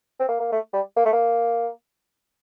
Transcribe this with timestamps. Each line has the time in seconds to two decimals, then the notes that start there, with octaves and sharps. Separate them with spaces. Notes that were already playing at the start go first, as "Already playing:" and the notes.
0.19 C4
0.29 A#3
0.40 A#3
0.52 A3
0.73 G3
0.97 A#3
1.05 A3
1.13 A#3